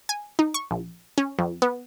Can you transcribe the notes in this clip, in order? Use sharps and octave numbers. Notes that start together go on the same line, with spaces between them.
G#5
D#4
C#6
A#1
C#4
F2
B3